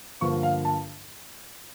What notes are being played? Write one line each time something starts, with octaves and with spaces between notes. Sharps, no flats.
G2 D3 F3 A#3 C#6
F5
A5